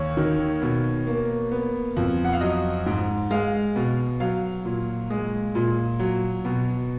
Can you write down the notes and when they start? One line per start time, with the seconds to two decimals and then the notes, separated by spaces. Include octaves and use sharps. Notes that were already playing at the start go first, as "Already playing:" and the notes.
Already playing: D#2 C#5
0.17 D#3
0.62 B2
1.07 A#3
1.52 B3
1.96 F2
2.25 F#5
2.33 F5
2.41 F#3 D#5
2.86 G#2
3.31 G#3 F5
3.76 B2
4.20 F#3 F5
4.65 A#2
5.10 G#3
5.55 A#2
5.99 F#3
6.45 B2